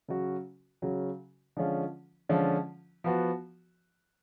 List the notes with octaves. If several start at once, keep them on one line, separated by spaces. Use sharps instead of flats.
C#3 F#3 C#4 F#4
C#3 F#3 C#4 F#4
D3 F3 G#3 C#4 F4
D3 F3 G#3 C#4 F4
F3 B3 F#4